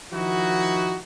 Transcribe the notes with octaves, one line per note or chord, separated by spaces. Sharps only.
D#3 F3 D#4 E4 F#4